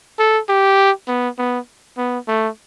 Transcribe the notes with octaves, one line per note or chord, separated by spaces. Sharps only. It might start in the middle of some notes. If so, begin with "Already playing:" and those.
A4
G4
B3
B3
B3
A3